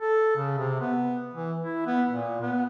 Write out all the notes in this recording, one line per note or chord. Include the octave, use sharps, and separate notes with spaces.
A4
C#3
C3
B3
E3
E4
B3
A#2
B3